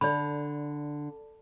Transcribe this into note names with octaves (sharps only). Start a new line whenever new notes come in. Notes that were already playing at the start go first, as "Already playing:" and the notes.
D3 D5 B5